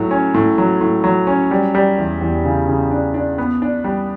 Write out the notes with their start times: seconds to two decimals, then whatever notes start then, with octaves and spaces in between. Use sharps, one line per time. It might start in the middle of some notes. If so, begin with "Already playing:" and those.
Already playing: A2 F#3
0.11 C#4
0.34 A2
0.58 F#3
0.81 A2
1.04 F#3
1.27 C#4
1.51 G3
1.75 G3
1.98 E2
2.21 E2
2.44 C#3
2.67 C#3
2.91 D4
3.14 D4
3.38 B3
3.62 D4
3.84 G3